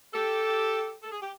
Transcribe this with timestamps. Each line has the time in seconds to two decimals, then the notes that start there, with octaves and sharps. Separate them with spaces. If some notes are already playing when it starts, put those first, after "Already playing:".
0.13 G4 A4
1.03 A4
1.11 G#4
1.21 G4